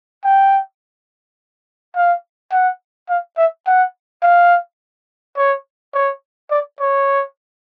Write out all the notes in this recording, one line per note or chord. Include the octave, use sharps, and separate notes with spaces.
G5
F5
F#5
F5
E5
F#5
F5
C#5
C#5
D5
C#5